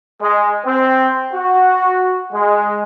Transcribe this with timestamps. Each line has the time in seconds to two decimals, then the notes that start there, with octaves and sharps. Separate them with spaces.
0.21 G#3
0.65 C4
1.33 F#4
2.32 G#3